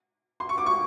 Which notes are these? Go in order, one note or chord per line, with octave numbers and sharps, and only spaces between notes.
C6
C#6
D6
C#6